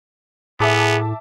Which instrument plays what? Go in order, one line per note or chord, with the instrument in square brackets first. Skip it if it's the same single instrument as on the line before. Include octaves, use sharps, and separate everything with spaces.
[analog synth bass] A2 [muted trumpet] B3 [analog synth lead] G#4 [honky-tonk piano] E5 A5 D6